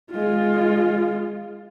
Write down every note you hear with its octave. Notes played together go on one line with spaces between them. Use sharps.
G#3 F4